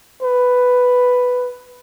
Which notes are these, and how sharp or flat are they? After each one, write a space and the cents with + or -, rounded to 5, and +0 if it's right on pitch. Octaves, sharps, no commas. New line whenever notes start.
B4 +5